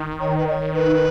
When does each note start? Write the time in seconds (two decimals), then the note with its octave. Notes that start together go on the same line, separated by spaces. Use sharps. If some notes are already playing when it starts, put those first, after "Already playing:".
Already playing: D#3
0.20 C#5
0.37 B4
0.47 D#5
0.51 C#5
0.74 B4